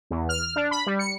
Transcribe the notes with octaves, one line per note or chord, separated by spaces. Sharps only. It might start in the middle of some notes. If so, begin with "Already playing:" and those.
E2
F6
D4
B5
G3
C#7